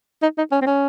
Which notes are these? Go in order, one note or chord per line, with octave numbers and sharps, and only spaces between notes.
D#4
D#4
C#4
C4
C#4